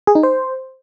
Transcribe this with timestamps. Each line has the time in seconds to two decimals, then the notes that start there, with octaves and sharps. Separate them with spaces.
0.07 G#4
0.15 D#4
0.23 C5